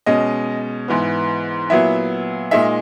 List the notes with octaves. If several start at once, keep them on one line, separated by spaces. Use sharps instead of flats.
B2 G#3 C#4 D#5
G#2 E3 B3
A#2 F#3 B3 E4 E5
A#2 G#3 D#4 E5